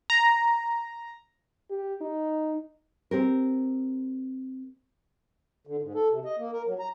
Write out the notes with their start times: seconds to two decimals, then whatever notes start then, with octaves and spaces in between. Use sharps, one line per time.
0.10 A#5
1.70 G4
2.01 D#4
3.11 C4 G4 A#4
5.67 D3
5.82 G#2
5.95 A4
6.10 C3
6.25 D#5
6.38 A#3
6.52 A#4
6.66 F#3
6.79 A#5